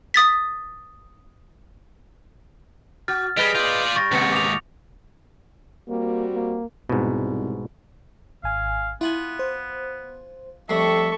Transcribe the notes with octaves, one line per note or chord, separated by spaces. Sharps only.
D#6 A6 B6
F#4 F6 A6
G3 G#4 B4 D#5 D7 F7 G7
F4 D5 G6
G3 C#6 A6 A#6
D#2 G#2 C3 B3 A6 C#7
D6 D#6 F7
G3 A#3 C4 F#4
A#3
C2 G#2 B2
G#1 F5 G#5
B3 E4 F4 F#5 G#5
C5
F2 G3 A3 A4 E5 C#6 C7